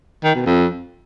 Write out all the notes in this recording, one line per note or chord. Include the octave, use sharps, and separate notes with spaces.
D#3
B2
F2